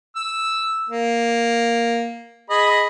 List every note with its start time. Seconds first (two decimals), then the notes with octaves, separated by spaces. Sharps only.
0.16 E6
0.89 A#3
2.50 G#4 D#5 B5